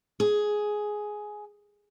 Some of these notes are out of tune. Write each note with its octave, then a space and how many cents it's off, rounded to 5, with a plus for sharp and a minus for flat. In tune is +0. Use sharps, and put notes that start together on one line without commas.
G#4 +10